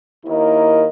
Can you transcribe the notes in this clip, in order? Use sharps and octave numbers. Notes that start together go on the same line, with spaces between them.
D#2 D#3 A#3 E4 A#4 D#5